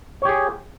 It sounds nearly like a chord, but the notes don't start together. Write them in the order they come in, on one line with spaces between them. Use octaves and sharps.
C#5 G4 G#4